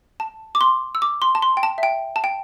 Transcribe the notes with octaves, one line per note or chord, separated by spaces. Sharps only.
A5
D6
C6
E6
D6
C6
A5
C6
G5
A5
E5
G5
A5
G5